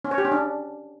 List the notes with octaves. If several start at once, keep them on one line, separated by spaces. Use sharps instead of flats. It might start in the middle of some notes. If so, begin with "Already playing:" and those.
C#4
C#5
G4
C#4
D4